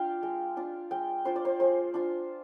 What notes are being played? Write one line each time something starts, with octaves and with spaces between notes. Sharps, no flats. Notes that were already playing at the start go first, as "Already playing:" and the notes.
Already playing: D4 F4 F5 G5
G#3
D4 F4
G#3 G5
D4 F4 C5
D5
C5
G#3 C5
D4 F4